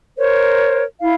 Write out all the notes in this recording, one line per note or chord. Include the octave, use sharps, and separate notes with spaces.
A#4 C5 C#5
E4 F5